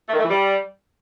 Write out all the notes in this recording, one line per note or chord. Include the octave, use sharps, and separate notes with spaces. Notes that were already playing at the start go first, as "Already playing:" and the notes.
A3
D#3
A3
E3
G3